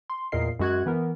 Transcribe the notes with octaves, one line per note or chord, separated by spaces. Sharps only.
C6
E2 A#2 A#4 D#5 C7
F#2 G#3 F#4 F#6 G#6
E3 B3 A#4